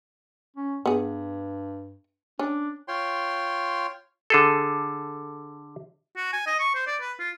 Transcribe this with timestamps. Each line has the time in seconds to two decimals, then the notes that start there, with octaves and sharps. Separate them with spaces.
0.56 C#4
0.86 G2 B3 G#4
2.39 C#4 D4
2.88 F4 C#5 G5 C6
4.30 D3 G#4 A4
6.16 F#4
6.33 G#5
6.47 D#5
6.60 C#6
6.75 C5
6.87 D5
7.01 B4
7.19 F4